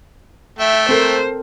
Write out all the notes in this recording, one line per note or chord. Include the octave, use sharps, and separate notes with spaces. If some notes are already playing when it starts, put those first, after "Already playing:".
A3 E5 G5
C4 A4 A#4 C5